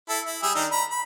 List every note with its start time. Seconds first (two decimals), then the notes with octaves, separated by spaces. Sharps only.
0.09 E4 A4
0.26 E4
0.43 G3 G#4 E6
0.55 D#3 D4 D#4
0.72 A#5 B5
0.91 B5